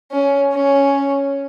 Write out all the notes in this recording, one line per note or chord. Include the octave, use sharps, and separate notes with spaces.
C#4
C#4